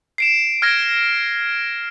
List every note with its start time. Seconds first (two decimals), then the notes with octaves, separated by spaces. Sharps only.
0.18 C7 D7 E7
0.62 F6 G#6 A#6 D7